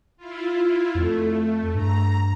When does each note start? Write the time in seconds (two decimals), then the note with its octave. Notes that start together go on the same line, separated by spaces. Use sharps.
0.17 E4 F4
0.95 F2 A3
1.75 G2 A#5